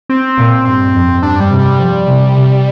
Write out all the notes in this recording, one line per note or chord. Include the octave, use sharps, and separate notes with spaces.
C4
A#2
G2 C4
F2
G2 D4
G3
C3
G3
F3
C3
C3